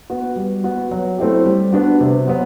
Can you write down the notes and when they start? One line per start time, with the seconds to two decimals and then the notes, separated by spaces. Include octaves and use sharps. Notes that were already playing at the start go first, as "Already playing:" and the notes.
0.10 B3 F#4
0.36 G3
0.64 B3 F#4
0.91 F#3
1.18 A3 C4 E4 G4
1.46 G3
1.73 B3 D4 F#4
2.01 C3
2.27 F#3 B3